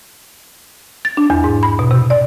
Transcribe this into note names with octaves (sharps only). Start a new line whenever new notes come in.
A6
D4
E2
G#2
B5
B2
C3
D5